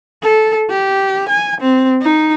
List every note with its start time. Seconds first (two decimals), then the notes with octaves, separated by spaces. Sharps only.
0.23 A4
0.70 G4
1.29 G#5
1.61 C4
2.02 D#4